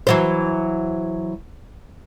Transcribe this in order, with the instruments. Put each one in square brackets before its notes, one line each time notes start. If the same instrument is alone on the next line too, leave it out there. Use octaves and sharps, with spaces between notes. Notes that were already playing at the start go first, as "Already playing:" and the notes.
[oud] E3 F#3 C5